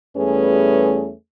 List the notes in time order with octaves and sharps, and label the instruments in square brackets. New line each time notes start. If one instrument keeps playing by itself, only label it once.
[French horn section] E2 G3 A3 C#4 G#4 B4